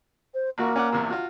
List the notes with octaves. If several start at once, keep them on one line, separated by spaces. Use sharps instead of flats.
C5
A1 A#3 F#4 C#6
C#4 D5 F#5
A#1 E2 C3
F4 F#4